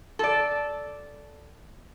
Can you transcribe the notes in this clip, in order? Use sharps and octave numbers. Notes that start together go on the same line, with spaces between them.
A4 D5